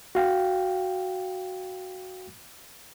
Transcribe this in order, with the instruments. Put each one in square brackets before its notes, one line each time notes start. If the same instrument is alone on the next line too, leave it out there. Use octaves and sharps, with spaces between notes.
[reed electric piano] F#4 F5 G5